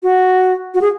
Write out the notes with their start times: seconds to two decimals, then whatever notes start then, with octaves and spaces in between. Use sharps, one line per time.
0.03 F#4
0.74 F#4
0.81 G#4